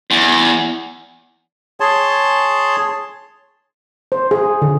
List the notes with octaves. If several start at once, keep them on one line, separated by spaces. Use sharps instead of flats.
E2
G#4 C#5 A5 C6
C5
G#4
D3